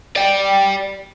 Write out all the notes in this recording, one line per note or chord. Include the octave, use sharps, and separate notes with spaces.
D5 G5